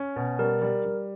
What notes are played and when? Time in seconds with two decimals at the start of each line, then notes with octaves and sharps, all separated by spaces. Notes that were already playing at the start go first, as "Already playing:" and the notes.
Already playing: C#4
0.16 B2
0.39 G3 A#4
0.62 G3
0.85 G3